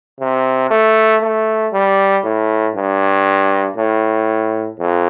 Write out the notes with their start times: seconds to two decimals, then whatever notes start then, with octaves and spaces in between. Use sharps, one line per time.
0.20 C3
0.70 A3
1.22 A3
1.73 G3
2.24 A2
2.75 G2
3.76 A2
4.79 F2